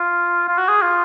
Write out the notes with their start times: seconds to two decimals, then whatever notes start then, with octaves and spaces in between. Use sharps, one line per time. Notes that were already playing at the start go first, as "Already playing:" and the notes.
Already playing: F4
0.48 F4
0.58 F#4
0.68 G#4
0.82 F4